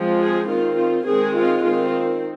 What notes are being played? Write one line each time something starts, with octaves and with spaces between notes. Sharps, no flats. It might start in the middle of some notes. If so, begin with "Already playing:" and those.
Already playing: F3 G#3 C4
G#4
D#3 C4 F4
F4
D#3 G#3 C4 G#4
F4
D#3 C4 F4